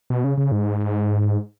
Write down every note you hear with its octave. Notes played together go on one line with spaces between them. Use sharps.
B2
C#3
C#3
G#2